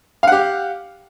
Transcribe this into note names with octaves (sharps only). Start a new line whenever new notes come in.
G4 F5 F#5